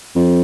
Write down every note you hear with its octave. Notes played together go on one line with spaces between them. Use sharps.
F2